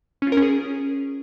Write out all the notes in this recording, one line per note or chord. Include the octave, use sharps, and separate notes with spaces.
C#4
F4
A#4
C#4
G#4